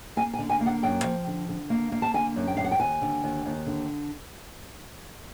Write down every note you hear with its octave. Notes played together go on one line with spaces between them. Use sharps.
A#3 G#5
G#5
D3
G#5
A#3
F#5
F#2 G5
F3
D3
D3
A#3
A#3
A5
D3 G#5
F#2
G5
F#2 F5
F#5
G5
D#2 G#5
D3
D#2
D#2
D3